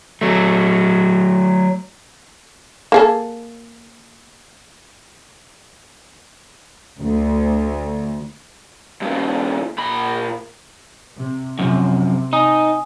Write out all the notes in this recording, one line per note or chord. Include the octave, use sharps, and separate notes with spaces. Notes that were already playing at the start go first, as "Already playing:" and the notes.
F#3 A3
A#3 G#4 A4
D2
G2 C#3
A#2 B5
C3
F#2 C3 F3
D#4 G#5 D#6